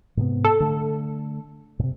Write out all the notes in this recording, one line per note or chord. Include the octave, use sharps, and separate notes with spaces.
G#2 C3 B3
A4
D3 A3
A2 C3